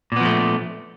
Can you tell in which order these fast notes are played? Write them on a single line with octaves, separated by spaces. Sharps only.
A#2 B3 F3 A3